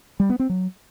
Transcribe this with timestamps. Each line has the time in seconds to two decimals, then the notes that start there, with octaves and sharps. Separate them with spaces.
0.20 G3
0.30 B3
0.40 C4
0.49 F#3